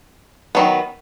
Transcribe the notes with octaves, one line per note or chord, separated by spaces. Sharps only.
D#3 F#3 B3